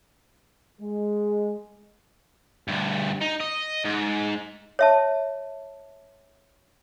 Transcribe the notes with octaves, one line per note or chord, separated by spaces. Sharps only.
G#3
D2 G2
D#4
D#5
G#2
C#5 E5 A5